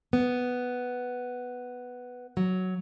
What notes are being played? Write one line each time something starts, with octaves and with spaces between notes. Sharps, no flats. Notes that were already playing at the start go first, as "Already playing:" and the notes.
B3
F#3